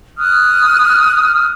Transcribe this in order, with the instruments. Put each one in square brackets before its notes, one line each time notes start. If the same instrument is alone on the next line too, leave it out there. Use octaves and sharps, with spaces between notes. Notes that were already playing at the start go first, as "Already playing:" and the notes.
[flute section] D#6 F6 F#6